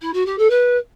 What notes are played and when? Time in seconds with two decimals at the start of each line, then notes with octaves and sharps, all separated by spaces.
0.01 E4
0.13 F#4
0.25 G4
0.38 A4
0.50 B4